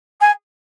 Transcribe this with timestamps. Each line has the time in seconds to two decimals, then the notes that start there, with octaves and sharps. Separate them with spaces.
0.20 G#5